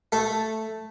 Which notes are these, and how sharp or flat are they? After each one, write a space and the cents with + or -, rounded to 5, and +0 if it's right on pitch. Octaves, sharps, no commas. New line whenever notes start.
A3 +0 A4 +0